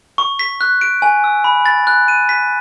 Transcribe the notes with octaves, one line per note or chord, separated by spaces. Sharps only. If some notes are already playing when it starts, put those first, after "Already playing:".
C#6
B6
F#6
D7
G#5
E6
B5
A6
F#6
D#7
B6